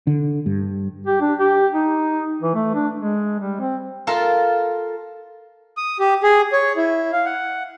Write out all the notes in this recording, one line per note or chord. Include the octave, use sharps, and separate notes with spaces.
D3
G2
G4
D4
G4
D#4
E3
A3
D4
G#3
G3
C4
F4 A4 A#4 A5
D#6
G4
G#4
C#5
E4
F5
F#5